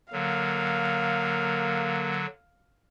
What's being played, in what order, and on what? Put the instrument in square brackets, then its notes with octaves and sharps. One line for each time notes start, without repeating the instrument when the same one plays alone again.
[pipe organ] D3 F#3 [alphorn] A#3 [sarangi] F5